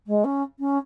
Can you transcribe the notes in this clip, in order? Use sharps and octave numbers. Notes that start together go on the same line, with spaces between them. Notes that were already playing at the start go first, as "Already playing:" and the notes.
G#3
C#4
C#4